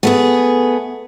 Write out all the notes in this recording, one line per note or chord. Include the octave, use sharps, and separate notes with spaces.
A3 B3 G#4